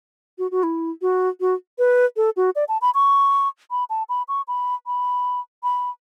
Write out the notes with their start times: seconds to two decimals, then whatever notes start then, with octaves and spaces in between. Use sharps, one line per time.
0.38 F#4
0.51 F#4
0.63 E4
1.02 F#4
1.40 F#4
1.79 B4
2.17 A4
2.37 F#4
2.56 D5
2.69 A5
2.82 B5
2.95 C#6
3.71 B5
3.90 A5
4.09 B5
4.28 C#6
4.48 B5
4.87 B5
5.63 B5